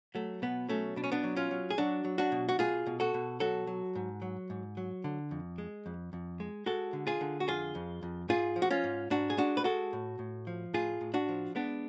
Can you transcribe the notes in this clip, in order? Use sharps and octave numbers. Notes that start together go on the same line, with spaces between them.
F#3 A3
B2 B3
F#3 A3 C#4
B2 D4
C#4
B3 D4
F#3
C#4 F4
F#3
G#4
F#3 D4 F#4
F#3
D4 F#4
B2
F#4
B2 F4 G#4
B2
F#4 A4
B2
F#3 F#4 A4
F#3
G#2
F#3
G#2
F#3
D3
F2
G#3
F2
F2
G#3
G#3 F#4 A4
D3
F4 G#4
D3
F#4
F2 F4 G#4
F2
F2
G#2 F4 G#4
F3
F#4
C#4 F4
G#2
G#2 D4 F#4
G#4
G#3 D4 F#4
B4
G#3 F#4 A4
A2
A2
F3
A2 F4 G#4
A2
D4 F#4
F3
G#3 B3 D4